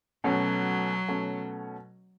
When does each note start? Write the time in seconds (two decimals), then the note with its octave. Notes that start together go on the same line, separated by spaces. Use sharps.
0.24 B2 F#3 A3 C#4
1.08 B2 A3 C#4